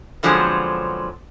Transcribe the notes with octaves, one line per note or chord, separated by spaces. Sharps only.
B2 D3 F3 F#3 G#3 C4